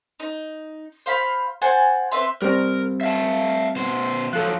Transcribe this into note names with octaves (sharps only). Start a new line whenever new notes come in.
D#4
C5 F5 B5
C5 F#5 G#5 A5
C4 B4 E5 C6
G3 C4 A#4
E5 F5 A5
B2 C5
F3 F#3 A4 F#6